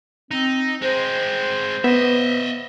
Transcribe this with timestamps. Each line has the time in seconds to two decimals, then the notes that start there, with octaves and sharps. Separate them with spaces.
0.31 C4 D#4
0.82 G#3 C4 C5
1.84 B3 D#5 E5